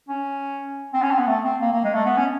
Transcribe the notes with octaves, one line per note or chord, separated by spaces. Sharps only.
C#4
C4
C#4
C4
B3
A3
C4
A#3
A#3
G#3
A3
B3
C#4